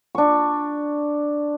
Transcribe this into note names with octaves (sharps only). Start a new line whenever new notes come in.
D4 C#6